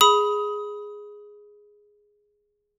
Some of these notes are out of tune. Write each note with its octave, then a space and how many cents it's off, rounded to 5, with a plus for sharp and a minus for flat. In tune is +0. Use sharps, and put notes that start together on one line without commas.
G#4 +0 B5 +0 D#6 +20